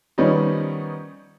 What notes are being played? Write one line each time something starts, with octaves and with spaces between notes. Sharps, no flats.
D#3 F3 G3 B3 C#4 D#4